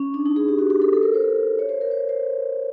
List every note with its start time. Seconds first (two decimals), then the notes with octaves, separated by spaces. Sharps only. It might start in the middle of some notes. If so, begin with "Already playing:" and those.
Already playing: C#4
0.14 D4
0.26 D#4
0.36 G#4
0.48 G4
0.59 F#4
0.70 G4
0.82 A4
0.93 A4
1.03 A#4
1.14 C5
1.59 C#5
1.69 C5
1.81 A#4
1.91 C5
2.09 C5